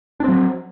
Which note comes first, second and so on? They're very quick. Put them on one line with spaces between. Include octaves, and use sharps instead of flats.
D4 C4 F#3